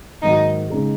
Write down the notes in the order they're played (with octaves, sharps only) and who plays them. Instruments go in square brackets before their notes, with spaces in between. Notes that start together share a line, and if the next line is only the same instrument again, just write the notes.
[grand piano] G#2 D#3 F#3 A#3 F#4 [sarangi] D#4
[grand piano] C#3 G#3 D#4 G#4